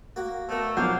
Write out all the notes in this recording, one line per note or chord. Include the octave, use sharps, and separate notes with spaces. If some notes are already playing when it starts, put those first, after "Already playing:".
A#3 F#4
B2 A3 A#3
B1 F3 A#3 C#4 F#5 G6